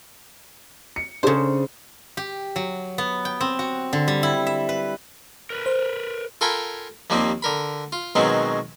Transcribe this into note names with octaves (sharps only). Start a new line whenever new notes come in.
C#7
C#3 D4 G#4 A4 C5
G4
F#3
B3
G5
C4
F#4
D3
G3
E4
E5
B4
A#4 B4
C5
F4 A4 A#4 G5 G#5 B5
D#2 F3 G3 A#3 C4
D3 A#4 B5
F4
B2 D#3 F#3 G#3 C4 C#4